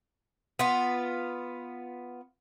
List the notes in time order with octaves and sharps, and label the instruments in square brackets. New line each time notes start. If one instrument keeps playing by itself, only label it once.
[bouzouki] B3 F4